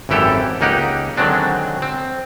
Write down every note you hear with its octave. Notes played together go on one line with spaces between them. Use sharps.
G#1 F#2 E3 E4 G4 A4
C#2 A#3 D#4 G4 F#5
D3 D#3 F#3 G#3 C4 D4
C4